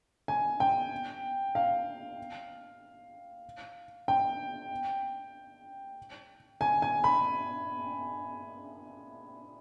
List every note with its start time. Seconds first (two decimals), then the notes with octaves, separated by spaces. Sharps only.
0.28 G#5
0.60 G5
1.55 F5
4.08 G5
6.61 G#5
6.82 G#5
7.04 B5